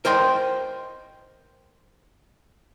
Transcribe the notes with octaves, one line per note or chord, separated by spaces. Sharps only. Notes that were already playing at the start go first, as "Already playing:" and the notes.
A#4 C5 D#5 G5 C6